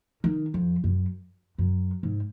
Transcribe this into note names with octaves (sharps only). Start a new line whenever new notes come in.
D#3
F2
F#2
F#2
G#2